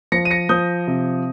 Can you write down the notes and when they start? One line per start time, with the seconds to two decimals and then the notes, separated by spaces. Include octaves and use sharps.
0.12 F3 A#6 C#7
0.25 D#7
0.31 A#6 C#7
0.49 F3 D#6 G6
0.87 C3